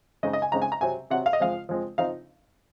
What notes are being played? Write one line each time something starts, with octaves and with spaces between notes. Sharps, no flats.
C#3 G#3 C4 D#4 D#5
D#5
G#5
C#3 G#3 C4 D#4 A#5
G#5
A#5
C3 F#3 C4 G#5
C3 F#3 C4 F#5
F5
D#5
F3 G#3 C4 F5
F3 G#3 C4
F3 C4 D#4 F5